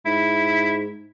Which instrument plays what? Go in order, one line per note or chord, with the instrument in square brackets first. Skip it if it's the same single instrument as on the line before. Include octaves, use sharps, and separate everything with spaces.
[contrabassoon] G#2 [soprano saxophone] E4